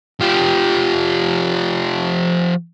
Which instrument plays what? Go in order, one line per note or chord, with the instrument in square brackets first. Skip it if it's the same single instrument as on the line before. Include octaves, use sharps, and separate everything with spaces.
[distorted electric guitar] F3 G4